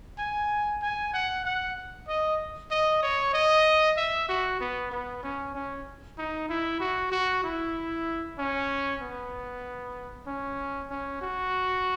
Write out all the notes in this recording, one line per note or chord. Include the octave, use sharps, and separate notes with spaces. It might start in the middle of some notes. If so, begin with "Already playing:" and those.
G#5
G#5
F#5
F#5
D#5
D#5
C#5
D#5
E5
F#4
B3
B3
C#4
C#4
D#4
E4
F#4
F#4
E4
C#4
B3
C#4
C#4
F#4